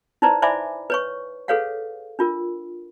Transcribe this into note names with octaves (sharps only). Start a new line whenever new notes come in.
D#4 E4 B4 C5 D5 A#5
C5 D5 E5 G#5 B5 D6
B4 C#5 C#6
G#4 A4 B4 C#5 F5 F#5
D4 F4 A#4